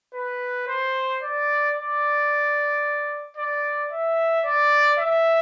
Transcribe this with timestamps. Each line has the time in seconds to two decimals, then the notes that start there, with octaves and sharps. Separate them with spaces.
0.14 B4
0.68 C5
1.22 D5
1.76 D5
3.37 D5
3.91 E5
4.45 D5
4.98 E5